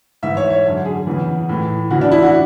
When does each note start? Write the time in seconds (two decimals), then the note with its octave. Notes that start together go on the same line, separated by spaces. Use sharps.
0.23 G#2 E3 E5
0.37 C#5
0.50 C#5
0.65 F#2 D3
0.85 G#4
1.07 E2 C#3 E3
1.49 A2 E3
1.91 E2 C#3 E3 F#4
2.01 D4
2.11 E4
2.22 F#4